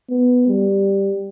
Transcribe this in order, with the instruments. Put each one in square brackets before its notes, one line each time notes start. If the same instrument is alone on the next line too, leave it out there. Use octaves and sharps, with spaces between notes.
[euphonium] B3
G3